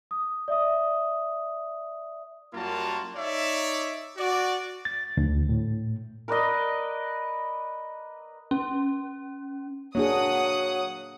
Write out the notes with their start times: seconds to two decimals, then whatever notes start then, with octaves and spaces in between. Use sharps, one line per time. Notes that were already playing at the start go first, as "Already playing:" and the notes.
0.11 D#6
0.48 D5 E5 D#6
2.54 F#2 G3 A#3 F4 F#4 A5
3.17 D#4 C#5 D5 E5
4.18 F#4 D5
4.85 A6
5.17 D2
5.49 A2
6.28 A#4 B4 D5 D#5
8.51 C#4
9.95 F#3 A#3 D4 G#4 F#5 D#6